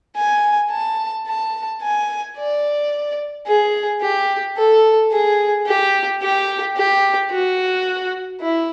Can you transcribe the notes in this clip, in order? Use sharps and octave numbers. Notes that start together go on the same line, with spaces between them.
G#5
A5
A5
G#5
D5
G#4
G4
A4
G#4
G4
G4
G4
F#4
E4